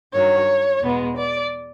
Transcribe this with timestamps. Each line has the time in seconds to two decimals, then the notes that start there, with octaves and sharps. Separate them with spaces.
0.13 G2 D#3 F#3 C#5
0.82 E2 B2 G#3 B3
1.16 D5